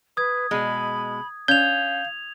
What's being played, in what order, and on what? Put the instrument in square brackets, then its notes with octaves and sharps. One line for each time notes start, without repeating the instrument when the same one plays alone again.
[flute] B4 [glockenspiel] D#6 G#6
[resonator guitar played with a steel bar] B2 G#3 [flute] B5
[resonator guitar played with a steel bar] C#4 [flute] F5 [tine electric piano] G6 [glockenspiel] G#6 F7